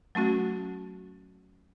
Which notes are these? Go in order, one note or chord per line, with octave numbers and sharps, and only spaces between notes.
F#3 A3 C#4 F#4